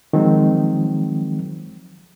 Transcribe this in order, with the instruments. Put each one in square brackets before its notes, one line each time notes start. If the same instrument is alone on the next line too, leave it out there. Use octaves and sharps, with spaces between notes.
[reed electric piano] D#3 F3 F#3 G#3 C4